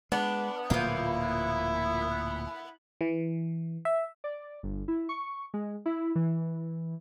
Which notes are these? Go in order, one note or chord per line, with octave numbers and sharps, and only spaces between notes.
G#3 B3 D4
D1 A#2 F3 A#3 E4
E3
E5
D5
G1
E4
C#6
G#3
E4
E3